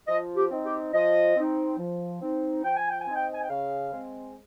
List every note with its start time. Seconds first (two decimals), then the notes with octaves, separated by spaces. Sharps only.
0.07 F3 D#5
0.35 G4
0.50 C4 D#4
0.65 G4
0.93 F3 D#5
1.35 C4 D#4
1.77 F3
2.21 C4 D#4
2.63 F3 G5
2.76 G#5
2.89 G5
3.01 G#5
3.07 C4 D#4
3.15 G5
3.33 G#5
3.41 G5
3.49 C#3 F5
3.92 G#3 C4